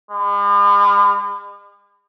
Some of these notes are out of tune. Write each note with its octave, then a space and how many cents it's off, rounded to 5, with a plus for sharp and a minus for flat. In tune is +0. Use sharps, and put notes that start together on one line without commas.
G#3 -45